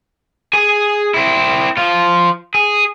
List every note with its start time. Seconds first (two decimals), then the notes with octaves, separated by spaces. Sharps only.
0.53 G#4 G#5
1.14 C4 E4
1.77 F3 F4
2.54 G#4